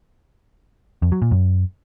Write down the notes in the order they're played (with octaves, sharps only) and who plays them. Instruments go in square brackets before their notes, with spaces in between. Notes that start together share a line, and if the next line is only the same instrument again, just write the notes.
[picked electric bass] F2
F#3
A#2
F#2